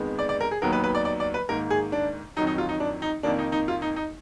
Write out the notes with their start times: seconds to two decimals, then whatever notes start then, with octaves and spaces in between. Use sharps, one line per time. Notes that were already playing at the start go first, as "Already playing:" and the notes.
Already playing: F2 D#3 G#3 B3
0.19 D5
0.29 D5
0.41 A#4
0.51 G#4
0.62 D#2 D#3 F#3 B3 A#4
0.73 B4
0.84 B4
0.95 D5
1.05 D5
1.20 D5
1.34 B4
1.49 G#2 D#3 A#3 A#4
1.70 G#4
1.92 D4
2.36 F2 D#3 F#3 D#4
2.47 D#4
2.58 F4
2.69 D#4
2.80 D4
3.02 D#4
3.23 F2 D#3 A#3 D4
3.39 D#4
3.52 D#4
3.68 F4
3.82 D#4
3.96 D#4